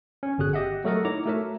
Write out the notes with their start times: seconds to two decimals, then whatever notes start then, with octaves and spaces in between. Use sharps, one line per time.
0.23 C#4
0.38 G1 D3 F#4 G#4 F#6
0.53 G4 D#5 E5 F#5
0.84 F#3 A3 A4 A#4 D#5 F#5
1.05 D#4 E4 C#5 A#5 D6
1.26 A3 F#4 A#4 C#5 E5